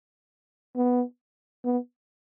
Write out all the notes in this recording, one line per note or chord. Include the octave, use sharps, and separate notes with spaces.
B3
B3